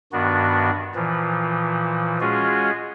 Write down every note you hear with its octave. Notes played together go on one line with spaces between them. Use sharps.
G2 D#3 B3 D4 F#4
A#2 E3 F3
G#3 C#4 F4 F#4 G#4